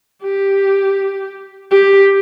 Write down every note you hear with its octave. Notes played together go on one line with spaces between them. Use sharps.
G4
G4